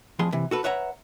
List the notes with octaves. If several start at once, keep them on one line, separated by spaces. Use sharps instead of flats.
F2 A2 F3 G#4 C6
C3 E3
F#4 A4 B4
B4 C#5 E5 F#5 A#5